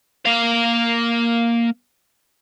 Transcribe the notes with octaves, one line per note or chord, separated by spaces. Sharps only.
A#3 F5